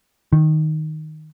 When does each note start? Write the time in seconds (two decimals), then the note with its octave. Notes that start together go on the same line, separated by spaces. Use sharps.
0.33 D#3